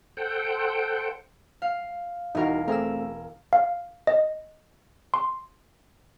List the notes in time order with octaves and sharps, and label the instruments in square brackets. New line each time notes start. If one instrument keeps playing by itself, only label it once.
[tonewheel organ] A4 C5 F#5 G5
[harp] F5
[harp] E1 A#4 F5 [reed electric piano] D#4 E4 F#4
[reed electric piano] A3 C4 G#4 [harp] A#4 E6
[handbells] F5
D#5
C6